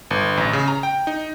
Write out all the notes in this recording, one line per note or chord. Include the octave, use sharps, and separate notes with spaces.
G1
A1
C#3
A#5
G5
D#4